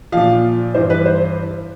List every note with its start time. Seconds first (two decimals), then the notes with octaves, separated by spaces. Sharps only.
0.12 A#2 F3 F5
0.74 G2 E3 C5
0.90 B4
1.06 C5